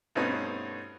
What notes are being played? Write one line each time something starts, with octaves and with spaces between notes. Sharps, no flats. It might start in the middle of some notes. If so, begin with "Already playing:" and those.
G2 B2 A3 C4 C#4 D#4